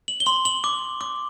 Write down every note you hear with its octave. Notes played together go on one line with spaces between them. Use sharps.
F#7
G7
C6 F#7
F#7
D6
D6